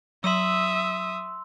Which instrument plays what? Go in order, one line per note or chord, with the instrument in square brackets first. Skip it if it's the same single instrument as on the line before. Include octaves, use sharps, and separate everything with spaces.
[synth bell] F#3 [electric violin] E5 D#6 [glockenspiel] C6 E6